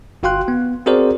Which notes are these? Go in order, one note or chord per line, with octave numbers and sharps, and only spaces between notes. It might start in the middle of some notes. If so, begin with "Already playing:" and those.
G1 F#4 F5 G5 C6 F#6
B3
C4 F#4 G#4 A#4 C5 D5